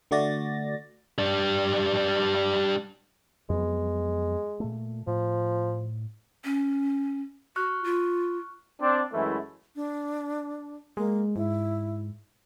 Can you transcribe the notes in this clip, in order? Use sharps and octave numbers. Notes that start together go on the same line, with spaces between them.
D3 A3 F#4 D5 A6 A#6
G3 D4
F2 F#3 G#3 B3
A#2 A3
A2 F3
C#4
F#4 C#6 F6 F#6
F4
C4 D4
F#2 E3 G#3 A3 E4
D4
G#3 A#3
G#2 E4